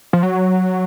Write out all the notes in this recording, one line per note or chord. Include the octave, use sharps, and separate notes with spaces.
F3
F#3